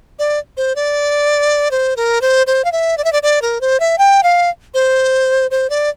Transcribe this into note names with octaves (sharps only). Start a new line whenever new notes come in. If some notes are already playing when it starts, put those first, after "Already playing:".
D5
C5
D5
C5
A#4
C5
C5
F5
E5
D5
E5
D5
D5
A#4
C5
E5
G5
F5
C5
C5
D5